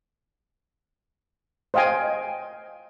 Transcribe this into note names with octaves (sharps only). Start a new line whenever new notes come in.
C5 D#5 F5 G5 G#5